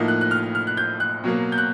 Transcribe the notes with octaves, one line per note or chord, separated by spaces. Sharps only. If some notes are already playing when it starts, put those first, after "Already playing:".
Already playing: A2 F3 A#3 D#4
F#6
F#6
F6
F6
F#6
G6
F#6
B2 F#3 A#3
G6
F#6